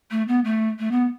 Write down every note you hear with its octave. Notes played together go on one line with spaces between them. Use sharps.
A3
B3
A3
A3
B3